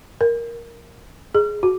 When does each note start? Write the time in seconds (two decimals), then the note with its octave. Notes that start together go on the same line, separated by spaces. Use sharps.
0.21 A#4
1.35 G#4
1.63 F#4